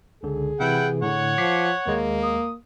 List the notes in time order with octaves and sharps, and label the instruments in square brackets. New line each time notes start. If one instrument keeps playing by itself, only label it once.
[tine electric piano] C#2 D3 [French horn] G#4
[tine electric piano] C3 E3 [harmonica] E4 F#5 G5
[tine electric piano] A2 D3 [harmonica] C#5 F#5
[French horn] F3 [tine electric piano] D6 B6 C7
[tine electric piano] D#2 G#3 [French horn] A#3
[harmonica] D#6